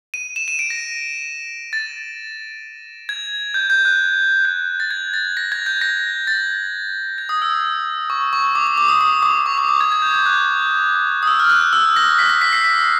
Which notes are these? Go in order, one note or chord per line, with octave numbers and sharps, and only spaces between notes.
D#7
E7
D#7
D7
A#6
A6
G#6
G6
G6
F#6
G6
A6
G#6
A6
A#6
G#6
G6
A#6
A6
G#6
D#6
E6
C#6
C#6
D6
D6
D6
D#6
D#6
D6
C#6
D6
D6
G#6
G#6
G6
G6
F#6
D#6
E6
F6
F#6
E6
A#6
B6
A#6
B6
C7
B6